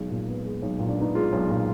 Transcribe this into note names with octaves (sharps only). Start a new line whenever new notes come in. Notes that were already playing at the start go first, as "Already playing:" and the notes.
Already playing: B1 G#3 G#4
A#2
B3
G#3
B1
A#2
D4
B3 D#4
G#3 F4
B1
A#2